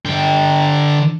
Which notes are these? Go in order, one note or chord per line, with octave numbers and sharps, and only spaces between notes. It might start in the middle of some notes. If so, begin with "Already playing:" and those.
D3 G5